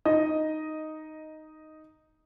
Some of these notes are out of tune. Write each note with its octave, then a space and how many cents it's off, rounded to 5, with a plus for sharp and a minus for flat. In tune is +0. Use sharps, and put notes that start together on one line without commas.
D#4 +0 D#5 +0